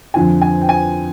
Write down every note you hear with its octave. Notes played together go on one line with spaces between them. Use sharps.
F2 D3 F3 G#5
G#5
G5
G#5